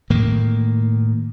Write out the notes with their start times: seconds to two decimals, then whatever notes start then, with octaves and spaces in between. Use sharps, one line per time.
0.10 A2 D#3 A#3